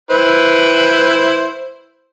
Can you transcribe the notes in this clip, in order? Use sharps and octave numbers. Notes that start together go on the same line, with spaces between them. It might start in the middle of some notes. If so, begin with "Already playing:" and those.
E4 B4 C5